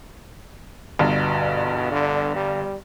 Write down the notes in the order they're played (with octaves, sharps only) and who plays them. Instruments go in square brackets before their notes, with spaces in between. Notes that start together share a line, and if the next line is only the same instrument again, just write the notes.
[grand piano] G1 G2 [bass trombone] B2
[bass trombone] D3
G3